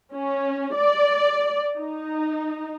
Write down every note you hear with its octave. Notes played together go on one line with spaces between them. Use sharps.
C#4
D5
D#4